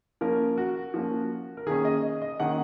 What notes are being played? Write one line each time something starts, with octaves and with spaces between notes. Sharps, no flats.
F3 A#3 C#4 A#4
F#4
F3 A#3 C#4
A#4
D#3 A#3 C#4 G#4
D#5
D#5
D#5
D#3 A#3 C#4 F#5